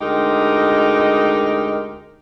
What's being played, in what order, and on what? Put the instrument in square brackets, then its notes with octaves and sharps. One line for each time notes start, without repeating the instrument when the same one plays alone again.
[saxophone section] D2 G#3 D#4 G4 A#4